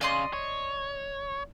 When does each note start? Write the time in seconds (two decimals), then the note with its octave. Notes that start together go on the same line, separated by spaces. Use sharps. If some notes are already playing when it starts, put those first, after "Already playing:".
0.01 C#3 D5 D#5 C6
0.33 C#5